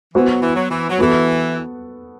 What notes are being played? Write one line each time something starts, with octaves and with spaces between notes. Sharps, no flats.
E3 B3 F#4 C5
F#3
E3
F#3
E3
F#3
E3 B3 F#4 A4